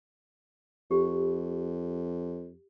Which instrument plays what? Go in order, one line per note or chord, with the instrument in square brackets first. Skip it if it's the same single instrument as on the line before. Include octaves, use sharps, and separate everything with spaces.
[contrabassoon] F2 [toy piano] G4